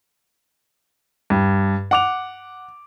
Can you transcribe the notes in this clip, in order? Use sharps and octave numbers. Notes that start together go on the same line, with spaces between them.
G2
F#5 D6 F7